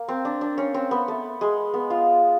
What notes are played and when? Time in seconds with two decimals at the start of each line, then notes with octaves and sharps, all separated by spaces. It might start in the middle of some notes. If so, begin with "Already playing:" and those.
Already playing: A#3
0.08 C4
0.25 D4
0.41 D4
0.58 C#4
0.74 C4
0.91 B3
1.08 A3
1.41 G#3
1.74 B3
1.90 F4